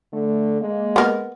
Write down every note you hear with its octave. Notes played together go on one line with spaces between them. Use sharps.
D3 A3
G#3 A#3
B3 A#4